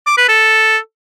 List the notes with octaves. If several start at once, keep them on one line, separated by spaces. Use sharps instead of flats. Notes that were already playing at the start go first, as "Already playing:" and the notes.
D6
B4
A4